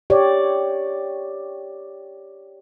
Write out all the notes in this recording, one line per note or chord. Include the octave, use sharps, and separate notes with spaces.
G4 C#5 D5